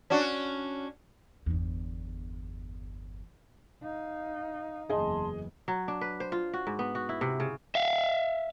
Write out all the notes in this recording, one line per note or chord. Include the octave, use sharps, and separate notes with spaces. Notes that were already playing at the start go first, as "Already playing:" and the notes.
C#4 D4 F#4
G1 E2
D#4 F5
F#1 E2 E3 G#4 D#5 A5 C6
F#3
D4
B4
C5
F4
F#4
G#2
B3
F#4
E4
C3
C#3
E5 F5